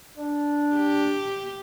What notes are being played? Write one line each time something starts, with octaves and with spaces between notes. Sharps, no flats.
D4
G4